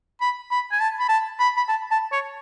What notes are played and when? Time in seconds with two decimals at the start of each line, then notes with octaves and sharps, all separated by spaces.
0.21 B5
0.51 B5
0.71 G#5
0.80 A5
0.99 B5
1.09 A5
1.39 B5
1.57 B5
1.69 A5
1.91 A5
2.12 C#5